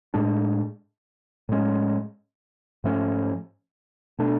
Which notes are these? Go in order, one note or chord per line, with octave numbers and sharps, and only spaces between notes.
A2 G#3 D4
A2 G#3 C#4
G#2 F3 A3 C#4
B2 A3 D4